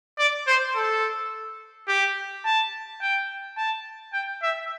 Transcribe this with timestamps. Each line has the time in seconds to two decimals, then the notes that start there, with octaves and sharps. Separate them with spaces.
0.19 D5
0.47 C5
0.76 A4
1.88 G4
2.45 A5
3.01 G5
3.57 A5
4.13 G5
4.42 E5